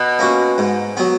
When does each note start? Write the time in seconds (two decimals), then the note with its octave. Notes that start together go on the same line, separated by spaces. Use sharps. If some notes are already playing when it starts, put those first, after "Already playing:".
Already playing: B2
0.19 A#3 C#4 F#4
0.58 G#2
0.97 F#3 B3